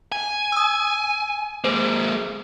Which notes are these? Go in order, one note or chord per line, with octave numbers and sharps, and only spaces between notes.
G#5
D#6 E6
G#3 A#3 C5